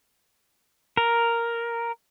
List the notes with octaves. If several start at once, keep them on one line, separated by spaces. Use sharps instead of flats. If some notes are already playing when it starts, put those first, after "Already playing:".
A#4